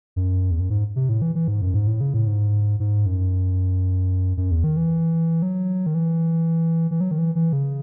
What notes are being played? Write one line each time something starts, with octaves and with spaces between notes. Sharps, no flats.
F#2
E2
F#2
G#2
C3
A2
E3
E3
G#2
F#2
G#2
A2
C#3
A2
G#2
G#2
F#2
F#2
E2
D#3
E3
F#3
D#3
E3
E3
F#3
D#3
E3
E3
C#3